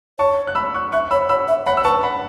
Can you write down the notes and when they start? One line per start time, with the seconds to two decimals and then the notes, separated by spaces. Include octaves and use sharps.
0.19 C#5 A5 C#6
0.47 F#6
0.55 B5 E6
0.74 C#6 F#6
0.92 E5 C#6 F#6
1.11 C#5 B5 E6
1.29 C#5 B5 E6
1.48 E5
1.66 C#5 F#5 B5
1.77 E6
1.84 B4 A5 C#6
2.03 F#5 B5